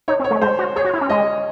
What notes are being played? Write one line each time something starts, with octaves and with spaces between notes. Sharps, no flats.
D#4 C#5
C4
C#5
A3
G#3 C5
F#4
G#4 C#5
F#4
E4
C#4
G#3 D#5